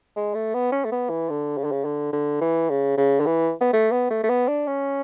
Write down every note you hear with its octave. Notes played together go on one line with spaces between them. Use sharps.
G#3
A3
B3
C#4
A3
B3
E3
D3
C#3
D3
C#3
D3
D3
E3
C#3
C#3
D3
E3
B3
A3
B3
A3
A3
B3
D4
C#4